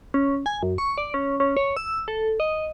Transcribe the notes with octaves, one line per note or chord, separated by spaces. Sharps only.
C#4
G#5
F#2
C#6
D5
C#4
C#4
C#5
E6
A4
D#5